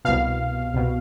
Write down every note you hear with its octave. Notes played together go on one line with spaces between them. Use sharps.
C2 B2 F5
C2 B2